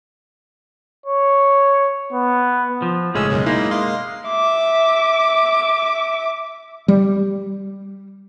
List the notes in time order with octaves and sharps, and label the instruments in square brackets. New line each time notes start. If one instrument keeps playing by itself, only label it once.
[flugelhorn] C#5
B3
[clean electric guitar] F3
[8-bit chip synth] G#1 A2 E6 [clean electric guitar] C#3 G#3 C#4
[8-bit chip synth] B1 F#2 B2
[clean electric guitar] G#3 A#3 [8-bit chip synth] D#4 E4
[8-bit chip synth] D#5 F5 C6
[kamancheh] E5 D6
[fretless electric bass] G3